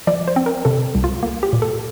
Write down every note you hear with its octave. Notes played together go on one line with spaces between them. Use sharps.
F3 D5
C5
C4
A#4
C3 A4
C2
F4
A#3
G4
A#2
A4